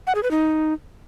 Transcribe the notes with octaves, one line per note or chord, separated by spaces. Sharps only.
F#5
G#4
B4
D#4